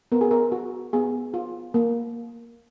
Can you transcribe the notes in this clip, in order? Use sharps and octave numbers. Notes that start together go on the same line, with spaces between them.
B3 A#4
G#4
A#4
F#4
B3 G#4
F4
A#3